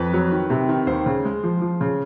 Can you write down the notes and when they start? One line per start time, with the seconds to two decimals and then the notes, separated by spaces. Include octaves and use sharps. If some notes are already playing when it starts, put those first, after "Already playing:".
Already playing: F2 B4
0.13 F#3
0.32 D#3
0.50 C3
0.69 D#3
0.87 D#2 C5
1.06 C#3
1.25 G#3
1.43 F3
1.62 F3
1.81 C#3